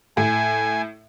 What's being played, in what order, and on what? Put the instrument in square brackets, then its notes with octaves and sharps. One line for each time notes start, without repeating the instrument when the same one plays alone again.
[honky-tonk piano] A2 [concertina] G#5